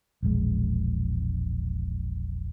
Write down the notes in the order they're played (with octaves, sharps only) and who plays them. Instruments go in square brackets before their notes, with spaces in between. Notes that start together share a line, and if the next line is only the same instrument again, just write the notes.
[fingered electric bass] E1 A#1 G#3